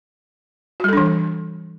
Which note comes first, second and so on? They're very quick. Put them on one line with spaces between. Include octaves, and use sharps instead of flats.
F#4 G3 A4 D4 E3